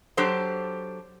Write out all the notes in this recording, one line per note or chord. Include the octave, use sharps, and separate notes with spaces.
F#3 D4 G4 A4 C5